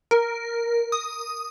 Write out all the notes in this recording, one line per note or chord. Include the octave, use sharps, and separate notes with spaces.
A#4
D#6